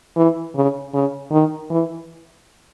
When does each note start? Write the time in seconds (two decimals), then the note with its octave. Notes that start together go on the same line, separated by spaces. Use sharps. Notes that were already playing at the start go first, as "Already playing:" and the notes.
0.16 E3
0.55 C#3
0.93 C#3
1.31 D#3
1.70 E3